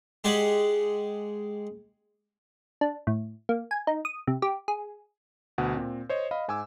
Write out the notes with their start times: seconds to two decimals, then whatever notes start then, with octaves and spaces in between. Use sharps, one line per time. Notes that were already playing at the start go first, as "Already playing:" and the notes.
0.24 G#3 G4 G#4 D5 F#5
2.81 D4
3.07 A2
3.49 A#3
3.71 G#5
3.87 D#4
4.05 D#6
4.27 C3
4.42 G4
4.68 G#4
5.58 D2 B2 F#5
5.76 A#2 C4
6.09 C5 C#5 D#5
6.31 D#5 F5 B5
6.48 G#2 G#5 D6 E6